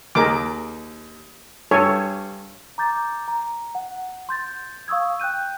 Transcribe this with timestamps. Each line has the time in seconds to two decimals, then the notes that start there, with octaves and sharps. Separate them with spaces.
0.15 D#2 G#4 A#4 D6
1.71 G2 A4 C#5 G#5
2.78 A#5 D6 G6 A6
3.28 A#5
3.75 F#5
4.29 C6 G6 A6
4.88 F5 C#6 D#6 E6 G#6
5.20 G5 F#6 G6 D#7